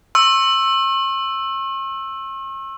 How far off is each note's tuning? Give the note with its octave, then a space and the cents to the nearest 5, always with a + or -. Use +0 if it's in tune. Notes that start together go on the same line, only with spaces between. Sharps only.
C#6 -45 E6 +0